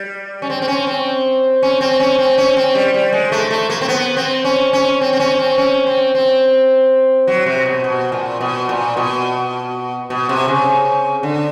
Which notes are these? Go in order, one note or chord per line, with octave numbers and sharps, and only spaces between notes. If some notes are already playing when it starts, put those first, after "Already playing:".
Already playing: G3
C#4
C4
C4
C#4
C4
C#4
C4
C#4
C4
C#4
C4
G3
G3
G#3
A3
A3
A#3
C4
B3
C4
C#4
C#4
C4
C4
C#4
C4
C#4
C4
C4
F#3
C3
B2
B2
A#2
B2
A#2
B2
B2
C3
C#3
D3